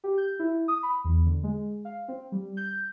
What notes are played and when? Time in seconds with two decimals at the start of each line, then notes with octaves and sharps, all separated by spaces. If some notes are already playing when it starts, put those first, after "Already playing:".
0.04 G4
0.18 G6
0.39 E4
0.68 D#6
0.83 B5
1.04 E2
1.26 D3
1.44 G#3
1.85 F5
2.08 C4
2.32 G3
2.57 G6